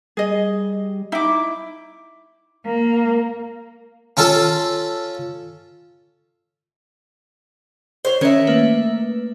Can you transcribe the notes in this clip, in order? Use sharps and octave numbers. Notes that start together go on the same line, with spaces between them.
G3 G#4 D#5
D#4 E4 D6
A#3
C#4 F4 A4
C5 C#5
D#3 C#4 A#4 C#5 E5
A3 A#3 B4